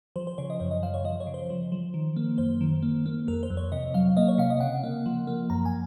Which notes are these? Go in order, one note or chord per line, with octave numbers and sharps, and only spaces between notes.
F3 C5
C5
C#3 C#5
D#5
F#2 C#5
D#5
F3 F5
C#5
F3 D#5
C#5
C#3
C5
F3
F3
D#3
A#3
F#2 C5
D#3
A#3
A#3
F2 A#4
C5
F2
C#5
C3 D#5
F#3 F5
A#3 D#5
C#5
C3 F5
D#5
C#3 F#5
A#3
F3
A#3
F#2 A#5
G#5